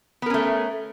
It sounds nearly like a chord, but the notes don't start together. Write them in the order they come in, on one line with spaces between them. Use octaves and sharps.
B3 A#4 C#4 A3